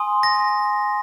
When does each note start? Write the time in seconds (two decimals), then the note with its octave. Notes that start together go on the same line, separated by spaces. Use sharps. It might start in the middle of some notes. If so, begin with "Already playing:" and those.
Already playing: G#5 C6 D#6
0.23 A#6